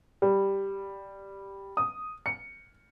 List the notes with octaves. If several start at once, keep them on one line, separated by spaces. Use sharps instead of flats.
G3
D#6
C#7